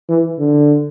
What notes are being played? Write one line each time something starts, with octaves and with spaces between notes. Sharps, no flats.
E3
D3